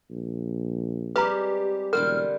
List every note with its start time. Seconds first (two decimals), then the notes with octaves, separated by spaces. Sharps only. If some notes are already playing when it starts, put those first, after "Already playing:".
0.10 A#1
1.16 G3 G#3 C4 G4 B4 A#5
1.93 E1 D3 G3 A#4 C5 F6